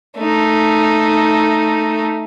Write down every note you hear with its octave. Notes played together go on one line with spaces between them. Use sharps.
A3 D#4